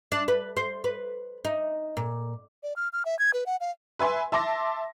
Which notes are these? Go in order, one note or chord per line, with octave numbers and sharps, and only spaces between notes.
D4
B4
C5
B4
D#4
A#2
D5
F6
F6
E5
G#6
B4
F#5
F5
B4 E5 G#5 C6
E5 A5 C6 D6 A#6